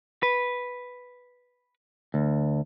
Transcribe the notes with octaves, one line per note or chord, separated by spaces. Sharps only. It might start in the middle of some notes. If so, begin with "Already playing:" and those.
B4
D2